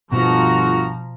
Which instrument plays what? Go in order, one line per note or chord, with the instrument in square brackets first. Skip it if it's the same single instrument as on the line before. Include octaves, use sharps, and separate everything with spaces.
[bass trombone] G1 [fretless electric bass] B2 [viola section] F3 A#5 [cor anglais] F#4